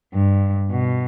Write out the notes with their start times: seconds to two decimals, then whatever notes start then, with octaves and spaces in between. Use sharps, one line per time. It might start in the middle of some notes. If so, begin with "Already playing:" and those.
0.13 G2
0.71 B2